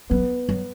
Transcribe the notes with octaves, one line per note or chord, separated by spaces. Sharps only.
F#3 B3
F#3